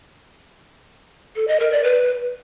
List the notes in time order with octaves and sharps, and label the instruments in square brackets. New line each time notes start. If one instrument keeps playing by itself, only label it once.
[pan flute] A4
D#5
A#4
D5
B4